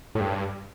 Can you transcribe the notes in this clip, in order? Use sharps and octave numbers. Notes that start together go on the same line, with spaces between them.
A2
G2